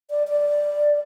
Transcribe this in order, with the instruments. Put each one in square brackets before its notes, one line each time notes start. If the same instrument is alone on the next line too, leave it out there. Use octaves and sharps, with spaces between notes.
[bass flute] D5
D5